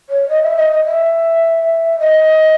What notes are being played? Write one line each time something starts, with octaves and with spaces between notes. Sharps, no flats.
C#5
D#5
E5
D#5
D#5
E5
D#5